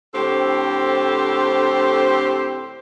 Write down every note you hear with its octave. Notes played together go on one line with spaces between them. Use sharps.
A2 D3 C4 G4 A4 C5